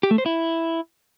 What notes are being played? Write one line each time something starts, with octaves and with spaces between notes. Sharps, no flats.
G4
A3
C5
E4